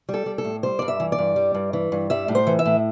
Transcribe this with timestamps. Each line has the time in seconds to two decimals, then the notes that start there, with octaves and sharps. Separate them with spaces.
0.09 G3
0.14 A4
0.26 G3
0.38 A4
0.45 A2
0.63 G3 C5
0.79 G2 D5
0.88 E5
1.00 E3
1.12 D5
1.18 G2
1.36 G3
1.54 G2
1.73 E3
1.92 G2
2.10 G3 E5
2.28 A2
2.35 C5
2.47 E3
2.59 E5
2.66 A2